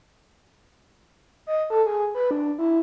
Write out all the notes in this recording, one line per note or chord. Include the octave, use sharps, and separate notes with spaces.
D#5
A4
G#4
B4
D4
E4